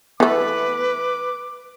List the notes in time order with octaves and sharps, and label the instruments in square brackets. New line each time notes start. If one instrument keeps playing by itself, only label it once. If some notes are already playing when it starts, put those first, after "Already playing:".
[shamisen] E3 A3 [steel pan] B3 A4 [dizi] B4 [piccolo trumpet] D6